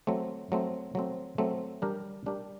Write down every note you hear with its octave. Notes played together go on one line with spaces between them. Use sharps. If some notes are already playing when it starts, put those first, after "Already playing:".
F#3 A3 C4
F#3 A3 C4
F#3 A3 C4
F#3 A3 C4
G3 D4 G4 A#4
G3 D4 G4 A#4